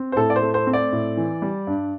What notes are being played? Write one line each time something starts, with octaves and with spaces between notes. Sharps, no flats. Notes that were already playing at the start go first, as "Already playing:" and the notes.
Already playing: C4
C5
A2 A4
D5
C5
A3
C5
C4
D5
A2
E3
G3
G2